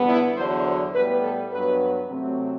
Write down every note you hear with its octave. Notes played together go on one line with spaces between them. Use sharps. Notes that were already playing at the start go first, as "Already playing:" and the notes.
Already playing: E2 D3 G3 B3
E4
E2 D3 F#3 C5
C5
A2 G3 B3 B4
A4
G2 F#3 B3 B4
C3 F#3 A3 C4